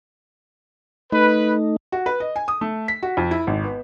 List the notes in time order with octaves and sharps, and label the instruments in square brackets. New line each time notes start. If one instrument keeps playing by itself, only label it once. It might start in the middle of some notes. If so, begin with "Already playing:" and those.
[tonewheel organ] A3 D#4 [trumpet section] B4
[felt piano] F#4
B4
D#5
G#5
D#6
A3
B6
F#4
F2
E4
G#1
B3